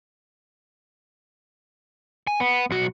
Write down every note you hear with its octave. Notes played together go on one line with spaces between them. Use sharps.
G#5
B3
B1 F#4